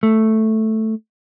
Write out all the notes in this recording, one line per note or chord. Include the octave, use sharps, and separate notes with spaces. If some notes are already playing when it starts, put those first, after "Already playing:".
A3